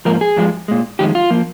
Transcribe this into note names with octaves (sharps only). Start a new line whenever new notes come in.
G#2 F3 A#3 A#4
G#4
G2 F3 G#3
A#2 G#3
F2 D#3 G#3 G4
F4
F3 A#3